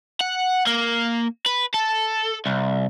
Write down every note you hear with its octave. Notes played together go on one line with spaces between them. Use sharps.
F#5
A#3
B4
A4
C2